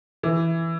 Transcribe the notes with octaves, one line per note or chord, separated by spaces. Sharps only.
E3